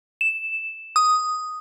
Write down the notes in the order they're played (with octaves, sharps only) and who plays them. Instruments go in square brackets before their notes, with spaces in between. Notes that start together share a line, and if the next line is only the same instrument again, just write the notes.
[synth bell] E7
D#6